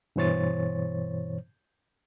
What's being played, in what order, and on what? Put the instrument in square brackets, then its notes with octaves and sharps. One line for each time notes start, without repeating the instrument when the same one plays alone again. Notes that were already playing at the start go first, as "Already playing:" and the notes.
[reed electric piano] G2 B2 E3 C5 C#5 A6